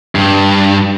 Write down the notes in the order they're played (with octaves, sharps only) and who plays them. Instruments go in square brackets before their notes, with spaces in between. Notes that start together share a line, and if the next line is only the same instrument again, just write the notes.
[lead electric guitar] G2